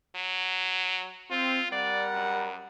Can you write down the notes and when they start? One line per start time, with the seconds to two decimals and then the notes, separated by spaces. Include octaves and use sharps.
0.16 F#3
1.31 C4 F4
1.72 G3 A#4 D5 F#5
2.14 F#2